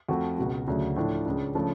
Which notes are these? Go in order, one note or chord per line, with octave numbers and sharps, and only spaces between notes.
F2 F3 A3 F#4
C#2 B2 G#3 F#4
D2 C#3 F#3 A3
A2 F3 A3 D4
C#2 C#3 G#3
C#3 F3 A3 D4